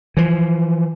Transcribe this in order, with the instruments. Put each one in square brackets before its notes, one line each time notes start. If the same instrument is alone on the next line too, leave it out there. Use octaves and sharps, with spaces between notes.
[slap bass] E3 F3